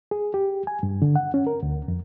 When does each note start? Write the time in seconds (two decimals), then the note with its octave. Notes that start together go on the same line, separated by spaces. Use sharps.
0.11 G#4
0.34 G4
0.67 G#5
0.83 G2
1.02 D3
1.16 F#5
1.34 C#4
1.47 A#4
1.63 D2
1.88 F2